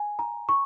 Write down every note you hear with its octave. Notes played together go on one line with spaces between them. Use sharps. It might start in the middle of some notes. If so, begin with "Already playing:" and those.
Already playing: G#5
A#5
C#6